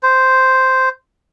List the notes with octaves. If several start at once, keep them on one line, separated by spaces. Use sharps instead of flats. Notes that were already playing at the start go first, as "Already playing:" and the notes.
C5